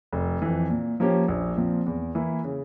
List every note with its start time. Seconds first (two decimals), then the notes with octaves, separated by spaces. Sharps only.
0.13 F1
0.42 F2 E3
0.70 A#2
1.00 F3 A#3 C#4 G4
1.28 A#1
1.57 A#2 F3 C4
1.86 E2
2.15 E3 A#3 E4
2.44 C#3